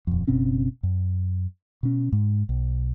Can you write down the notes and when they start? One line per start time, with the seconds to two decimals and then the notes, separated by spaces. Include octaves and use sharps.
0.07 D#1 F2
0.27 F#1 B2 C4 C#4
0.83 F#2
1.83 B2 C#4
2.12 G#2
2.49 B1